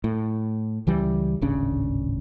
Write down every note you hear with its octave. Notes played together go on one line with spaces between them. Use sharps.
A2
C#2 E3 G3
D1 G#1 C#3 D4